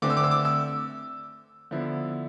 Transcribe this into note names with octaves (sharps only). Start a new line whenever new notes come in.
D3 A3 C4 D6
E6
D6
E6
D6
E6
D3 F3 B3 E4